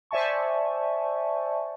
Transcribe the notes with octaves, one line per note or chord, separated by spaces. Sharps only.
C5 D5 E5 G#5 A5 C#6